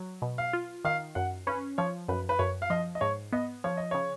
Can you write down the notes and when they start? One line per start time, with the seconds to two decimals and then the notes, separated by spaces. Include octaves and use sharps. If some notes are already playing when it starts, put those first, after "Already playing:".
Already playing: F#3
0.22 B2
0.38 F5
0.53 F4
0.84 D#3 F5
1.15 F#2 F#5
1.47 C#4 B4
1.78 F3 C#5
2.08 F#2 B4
2.29 B4
2.39 F#2 C#5
2.62 F5
2.70 F3 D#5
2.95 D#5
3.01 G#2 C#5
3.32 B3 D#5
3.64 F3 C#5
3.77 D#5
3.91 C#3 C#5